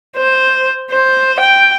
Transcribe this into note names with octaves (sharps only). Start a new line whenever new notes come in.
C5
C5
G5